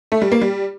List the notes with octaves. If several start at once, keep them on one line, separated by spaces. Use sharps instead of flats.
A3
G3
A#3
G3